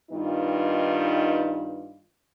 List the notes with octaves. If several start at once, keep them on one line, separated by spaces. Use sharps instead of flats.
G2 D#3 B3 D#4 F4